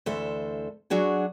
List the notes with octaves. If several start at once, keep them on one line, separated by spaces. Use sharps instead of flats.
D2 E3 A4 C5 E5
F#3 D4 F#4 G#4